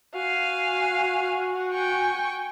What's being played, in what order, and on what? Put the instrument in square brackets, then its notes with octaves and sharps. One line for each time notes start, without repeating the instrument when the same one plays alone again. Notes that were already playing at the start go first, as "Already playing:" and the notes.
[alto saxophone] F#4 [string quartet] F5 G#5
[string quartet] G5 G#5 C#6